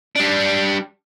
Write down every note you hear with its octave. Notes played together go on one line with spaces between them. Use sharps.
G3 D4